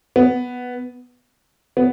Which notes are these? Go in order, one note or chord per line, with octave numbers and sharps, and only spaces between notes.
B3
B3